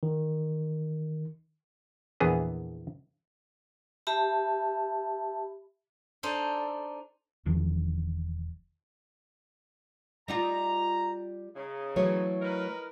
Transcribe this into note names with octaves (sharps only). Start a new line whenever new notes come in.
D#3
A#1 E2 E3 B3 G#4
G4 E5 A5 B5
D4 D#4 A4 C5
E1 E2 D#3 F3
G3 D#4 F4 A#5
C#3 D#4
E3 F#3 A3 C#5
D#4 A#4 B4